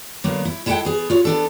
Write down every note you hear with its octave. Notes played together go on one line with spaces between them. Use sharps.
D3 F#3 A#3 B3
E4
G#3 E4 A4 C#5 F#5 G5
B3 G#4
F4 F#4 C#5
B3 D4 A4